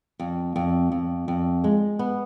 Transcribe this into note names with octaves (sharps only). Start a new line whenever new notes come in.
F2
F2
F2
F2
G#3
B3